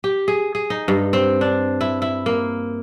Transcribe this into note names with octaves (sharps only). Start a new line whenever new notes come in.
G4
G#4
G#4
D#4
G2
C4
D4
E4
E4
A#3